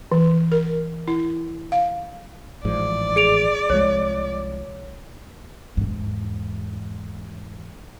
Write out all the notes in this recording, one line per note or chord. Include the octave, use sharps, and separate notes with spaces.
E3
A#4
E4
F5
A1 G#2 F3 D5
G#4 D7 F7
C2 F3 G#3 C#5
E2 G#2